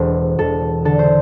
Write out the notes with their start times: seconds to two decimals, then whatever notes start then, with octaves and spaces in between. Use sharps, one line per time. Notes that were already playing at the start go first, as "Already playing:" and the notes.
Already playing: E1 A4 C5
0.39 E1 A4
0.85 D3 A4
0.99 C5